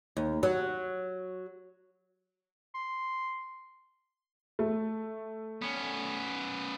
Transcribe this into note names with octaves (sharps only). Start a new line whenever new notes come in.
D#2
F#3
C6
A3
B3 C#4